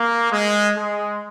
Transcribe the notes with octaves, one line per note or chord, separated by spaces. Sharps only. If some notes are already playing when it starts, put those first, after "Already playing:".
Already playing: A#3
G#3
G#3